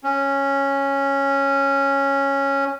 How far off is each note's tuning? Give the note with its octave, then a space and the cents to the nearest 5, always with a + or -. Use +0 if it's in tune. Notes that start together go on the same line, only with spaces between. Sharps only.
C#4 -5